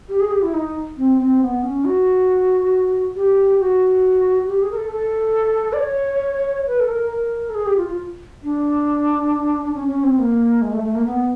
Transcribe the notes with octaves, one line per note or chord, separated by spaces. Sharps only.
G4
G#4
G4
E4
D#4
C4
C4
B3
C#4
F#4
G4
F#4
G4
G#4
A#4
A4
A4
D5
C#5
B4
A4
A#4
A#4
A4
G#4
G4
F4
F4
D4
D4
C#4
C#4
C4
A#3
G#3
A3
A3
A#3
B3